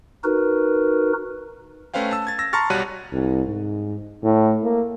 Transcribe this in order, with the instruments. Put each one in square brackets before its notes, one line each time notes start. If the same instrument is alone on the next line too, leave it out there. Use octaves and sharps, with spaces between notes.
[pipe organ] D#4 F#4 A#4 B4
[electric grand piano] A3 C#4 B4 C5 F5 G5
A5 E6
G#6 A6
E6 A#6
A5 A#5 C6 C#6 F6 A6
B1 G3 F#4 C#5 F#6 D#7
[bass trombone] C2
G#2
A2
A#3